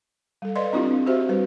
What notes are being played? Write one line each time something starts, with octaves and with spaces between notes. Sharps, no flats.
G3 A4
B4 D5 D#5 F5 C6
C4 D4 E4 F4 G4
C4
F#4 G4 C5 E5
G3 B4